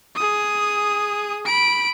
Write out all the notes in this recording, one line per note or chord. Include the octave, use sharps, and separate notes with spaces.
G#4 D#6
B5 D7